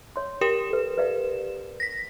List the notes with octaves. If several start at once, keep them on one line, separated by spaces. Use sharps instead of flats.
C#5 C6
G4 A#4 G5 E7
A4 B4
B4 D5 F5
A#6 B6